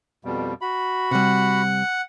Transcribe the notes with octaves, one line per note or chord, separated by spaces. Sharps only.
F2 B2 G3
F#4 B5
C3 G3 F#5